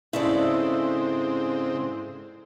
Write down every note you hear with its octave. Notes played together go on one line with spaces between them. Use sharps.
G#2 C#3 C4 E4 A4 D5